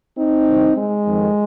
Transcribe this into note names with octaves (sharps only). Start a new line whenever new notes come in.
C4 D#4
C2 C3 D#3
G#3
F2 D#3